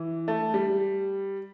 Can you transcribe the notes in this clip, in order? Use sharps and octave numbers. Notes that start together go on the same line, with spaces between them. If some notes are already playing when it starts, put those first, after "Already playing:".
Already playing: E3
A3
G3